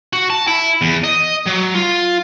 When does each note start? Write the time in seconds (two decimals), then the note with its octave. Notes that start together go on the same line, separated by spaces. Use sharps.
0.13 F#4
0.30 A5
0.47 E4
0.82 E2
1.04 D#5
1.46 F#3
1.75 F4